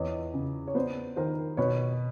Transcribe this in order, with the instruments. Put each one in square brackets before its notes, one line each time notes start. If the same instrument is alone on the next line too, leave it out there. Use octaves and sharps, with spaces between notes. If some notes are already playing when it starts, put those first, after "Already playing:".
Already playing: [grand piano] E2 C#5 D#5
C#3
C#5
B3 C5 D5
D#3 A#4 C5
B2 B4 C#5